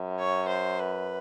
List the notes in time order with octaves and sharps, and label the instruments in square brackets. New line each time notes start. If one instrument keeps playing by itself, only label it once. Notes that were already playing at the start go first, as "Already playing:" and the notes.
Already playing: [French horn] F#2
[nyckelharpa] C#5
C5
B4